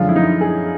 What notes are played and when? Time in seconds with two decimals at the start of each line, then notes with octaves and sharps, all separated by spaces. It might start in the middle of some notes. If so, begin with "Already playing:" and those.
Already playing: F#2 D3 F3 G#3 F4
0.09 E4
0.16 D#4
0.41 G#4